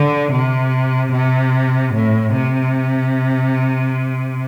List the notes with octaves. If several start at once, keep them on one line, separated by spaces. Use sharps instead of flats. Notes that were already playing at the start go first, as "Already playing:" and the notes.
Already playing: D3
C3
C3
A2
C3